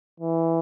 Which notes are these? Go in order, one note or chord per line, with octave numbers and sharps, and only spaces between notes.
E3